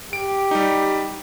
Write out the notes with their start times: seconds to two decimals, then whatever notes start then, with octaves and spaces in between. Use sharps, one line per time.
0.13 G4 D7
0.51 G3 D#4